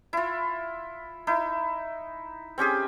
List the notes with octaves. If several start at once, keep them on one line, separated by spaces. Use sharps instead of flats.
E4 F4
D#4 E4
C4 C#4 G4 G#4